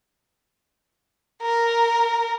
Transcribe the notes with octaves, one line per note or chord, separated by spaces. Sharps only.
A#4